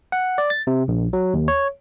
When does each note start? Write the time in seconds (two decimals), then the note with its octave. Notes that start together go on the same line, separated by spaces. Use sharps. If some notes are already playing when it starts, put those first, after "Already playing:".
0.12 F#5
0.38 D5
0.50 A6
0.67 C3
0.88 A#1
1.13 F#3
1.34 D#2
1.48 C#5